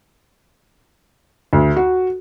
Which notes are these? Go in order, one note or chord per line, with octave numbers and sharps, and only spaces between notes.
D2
F#4